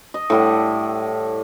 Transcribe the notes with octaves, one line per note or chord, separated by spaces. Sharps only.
D#5
A2 G3 F#5